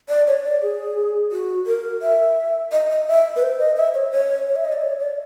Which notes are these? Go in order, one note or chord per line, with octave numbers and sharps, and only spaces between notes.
D5
C#5
D5
G#4
F#4
A#4
E5
D#5
D#5
E5
B4
C5
D#5
E5
C#5
C#5
C#5
E5
D#5
D5
C#5
D5